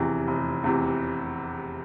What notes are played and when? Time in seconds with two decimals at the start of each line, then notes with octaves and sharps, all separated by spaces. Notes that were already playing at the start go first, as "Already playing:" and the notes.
Already playing: F1 E2 C3 E3
0.28 F1
0.64 E2 C3 E3